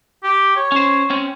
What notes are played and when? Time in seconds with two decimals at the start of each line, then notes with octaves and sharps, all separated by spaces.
0.24 G4
0.56 C#5
0.72 C#4 C5
1.10 C4 C#4